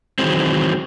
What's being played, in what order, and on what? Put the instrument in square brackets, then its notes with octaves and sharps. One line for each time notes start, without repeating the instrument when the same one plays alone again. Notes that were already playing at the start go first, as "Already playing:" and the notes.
[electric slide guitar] D#3 E3 F#3 G#3 C4